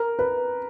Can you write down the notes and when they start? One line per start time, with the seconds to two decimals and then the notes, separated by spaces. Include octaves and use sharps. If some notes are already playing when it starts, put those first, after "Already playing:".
Already playing: A#4
0.19 B4